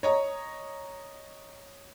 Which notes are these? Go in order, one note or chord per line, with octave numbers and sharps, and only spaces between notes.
C#5 D#5 A#5